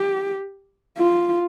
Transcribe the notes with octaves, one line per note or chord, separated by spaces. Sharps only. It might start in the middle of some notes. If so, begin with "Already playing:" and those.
Already playing: G4
F4